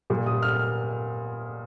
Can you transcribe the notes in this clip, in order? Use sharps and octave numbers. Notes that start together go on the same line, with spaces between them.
A#2 G3 A#3
D#6
F6